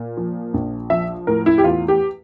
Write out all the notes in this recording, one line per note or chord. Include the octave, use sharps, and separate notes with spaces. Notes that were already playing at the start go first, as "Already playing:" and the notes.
Already playing: A#2
F3
A#1
F3 E5
A2 A#4
E4
G4
E2 F4
G4